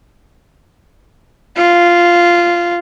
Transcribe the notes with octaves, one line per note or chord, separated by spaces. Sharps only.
F4